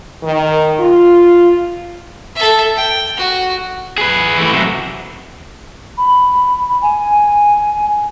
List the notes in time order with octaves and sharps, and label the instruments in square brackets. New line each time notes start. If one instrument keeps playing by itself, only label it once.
[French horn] D#3
F4
[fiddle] A4 E5
G5
F#4
[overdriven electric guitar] G#4 B4
E3 A3
C3 F#3
[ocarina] B5
G#5